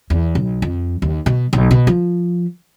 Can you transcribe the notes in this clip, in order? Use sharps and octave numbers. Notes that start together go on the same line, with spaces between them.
E2
B1
F2
D#2
B2
B1
B2
F3